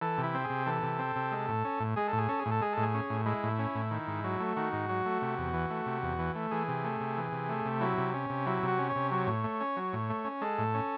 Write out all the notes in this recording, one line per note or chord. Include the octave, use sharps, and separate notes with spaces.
E3 A4
C3
E4
C4
G#4
C3
E3 A4
C3
C4
C3
G#3
A2
C#4
A2
G#3 G#4
A2 A4
G#4
C#4 A4
G#4
A2
A4
G#3 G#4
A2 A4
G#4
C#4
A2
G#3 E4
A2
C#4
A2
D#3
G#2
F#3
A3
D#3 F#4
G#2
F#3
A3
C3
E2
E3
A3
C3
E2
E3
A3
E3 G#4
C3
A3
C3
E3
C3
A3
C3
F#3 E4
C3
C#4
C3
F#3 E4
C3
F#4
C#4
C#5
C3
F#3 C#5
A2
A3
C#4
F#3
A2
A3
C#4
G#3 A4
A2
C#4